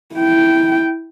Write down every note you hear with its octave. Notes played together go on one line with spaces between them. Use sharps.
E4 G5